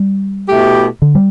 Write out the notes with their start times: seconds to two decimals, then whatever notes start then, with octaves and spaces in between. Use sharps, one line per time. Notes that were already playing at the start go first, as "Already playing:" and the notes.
Already playing: G3
0.49 B2 A3 E4 G4
1.02 D3
1.15 G3